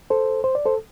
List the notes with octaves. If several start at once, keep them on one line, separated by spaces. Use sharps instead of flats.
A4 C5
C5
D5
A4 C5